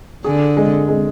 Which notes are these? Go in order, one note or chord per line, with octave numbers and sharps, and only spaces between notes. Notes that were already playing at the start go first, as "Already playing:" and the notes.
D3 G#4
G#3
G#3